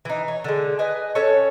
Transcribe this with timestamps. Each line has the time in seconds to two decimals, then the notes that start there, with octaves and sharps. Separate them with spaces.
0.05 E3 D#4
0.28 C#5
0.44 D3 G#3
0.79 B4 D#5 G#5
1.15 C#4 A4 C#5